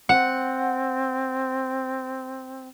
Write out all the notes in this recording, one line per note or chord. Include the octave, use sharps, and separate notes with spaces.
C4 F#5